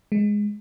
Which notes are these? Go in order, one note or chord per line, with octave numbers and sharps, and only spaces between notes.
G#3